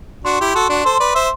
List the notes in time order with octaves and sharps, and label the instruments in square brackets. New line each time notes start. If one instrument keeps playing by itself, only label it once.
[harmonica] D4 F#4 [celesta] C6
[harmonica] E4 G4
[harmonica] F#4 A4 [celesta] C6
[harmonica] D4 F#4
[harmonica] A4 C5 [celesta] C6
[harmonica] B4 D5
C5 E5